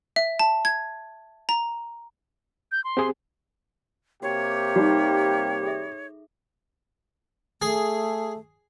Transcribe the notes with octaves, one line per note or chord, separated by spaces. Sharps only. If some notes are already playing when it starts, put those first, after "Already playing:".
E5
A5
G#6
A#5
G6
C6
C4 G4 G#4
C3 A#3 F#4 G4 C#5
G3 D#4 F#4
G#4 A4 E5
A3 G#4